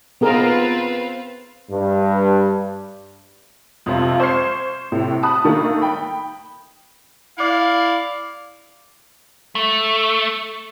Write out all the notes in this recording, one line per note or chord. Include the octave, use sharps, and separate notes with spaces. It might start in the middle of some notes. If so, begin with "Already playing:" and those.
B3 C4 F4 G#4 A#4 B4
G2
F2 C3 F4
C5 C#6 F6 G#6 C7
A2 C3
A5 B5 D#6 F#6
D#3 A3 A#3
G5 B5
E4 D5 F5
A3